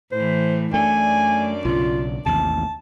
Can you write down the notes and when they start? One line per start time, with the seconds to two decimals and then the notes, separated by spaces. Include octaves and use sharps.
0.12 A2 E3 C5
0.74 F#2 A3 D4 D5 G#5
1.65 B1 C#3 F4
2.26 A1 D#2 C3 A5